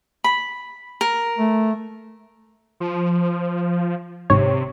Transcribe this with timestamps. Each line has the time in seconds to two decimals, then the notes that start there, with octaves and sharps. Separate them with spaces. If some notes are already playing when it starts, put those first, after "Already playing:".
0.24 B5
1.01 A#4
1.38 A3
2.80 F3
4.30 G#1 C3 C#5